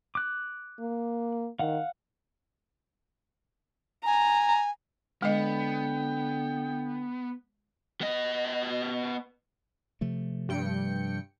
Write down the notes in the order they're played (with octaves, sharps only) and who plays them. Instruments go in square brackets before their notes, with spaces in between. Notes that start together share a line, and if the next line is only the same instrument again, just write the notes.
[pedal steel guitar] D6 F#6
[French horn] A#3
[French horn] D#3 [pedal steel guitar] F5 F#5
[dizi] G#5 [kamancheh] A#5
[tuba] D3 [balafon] G#3 D#5 [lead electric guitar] B3 [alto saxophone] G5
[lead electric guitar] B3 D#5
[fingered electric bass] C3 F3 A3
[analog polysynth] G2 G5 C#7